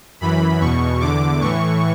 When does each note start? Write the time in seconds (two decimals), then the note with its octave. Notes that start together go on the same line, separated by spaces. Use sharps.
0.21 F#2 E3 B5
0.61 E2 B2 C#6
1.01 E2 D3 D6
1.41 A2 E3 C#6